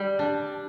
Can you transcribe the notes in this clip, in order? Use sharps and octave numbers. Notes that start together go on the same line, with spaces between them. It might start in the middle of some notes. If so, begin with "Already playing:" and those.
Already playing: G3
D4